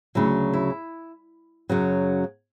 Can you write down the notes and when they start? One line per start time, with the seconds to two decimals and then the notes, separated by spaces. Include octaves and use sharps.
0.15 D2 C#3 F#3 E4
0.53 E4
1.70 F#2 C#3 F#3